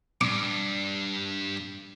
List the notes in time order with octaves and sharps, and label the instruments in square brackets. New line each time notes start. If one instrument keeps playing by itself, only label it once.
[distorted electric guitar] G2 [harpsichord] D6